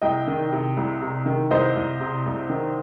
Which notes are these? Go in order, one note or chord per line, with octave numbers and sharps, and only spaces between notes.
C2 D#5 G5
D#3
C3
C2
C3
D#3
C2 C5 D#5
C2
C3
C2
D#3